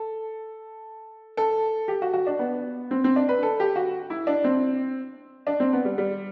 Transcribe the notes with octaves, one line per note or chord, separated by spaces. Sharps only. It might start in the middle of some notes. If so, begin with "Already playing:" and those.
Already playing: A4
A4
G4
F#4
F#4
D4
B3
C4
C4
D4
B4
A4
G4
F#4
E4
D4
C4
D4
C4
B3
G3
G3